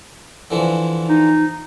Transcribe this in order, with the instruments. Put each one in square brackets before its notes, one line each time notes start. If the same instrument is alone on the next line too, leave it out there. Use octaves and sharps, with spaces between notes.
[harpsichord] D3 E3 F3
[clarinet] D#4